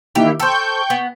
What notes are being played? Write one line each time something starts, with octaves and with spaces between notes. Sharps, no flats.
D#3 E3 A#3 E4 G4
A4 C5 G5 C#6 G6
B3